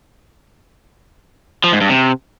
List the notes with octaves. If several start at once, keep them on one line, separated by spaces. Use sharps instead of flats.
F3
G#2
G2
C3